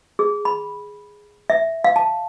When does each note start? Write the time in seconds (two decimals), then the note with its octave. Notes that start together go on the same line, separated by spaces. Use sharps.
0.19 G#4
0.45 B5
1.50 E5
1.84 F5
1.96 A5